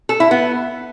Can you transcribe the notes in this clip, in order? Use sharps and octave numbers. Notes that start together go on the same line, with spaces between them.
A4
E4
B3